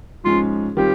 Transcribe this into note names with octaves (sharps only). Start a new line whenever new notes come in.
G#2 F3 G#3 C#4 F4
D#3 G3 C4 F4 G4